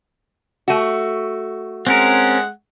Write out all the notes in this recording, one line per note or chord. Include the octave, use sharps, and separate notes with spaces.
A3 F#4
G#3 C4 C#4 A#4 F#5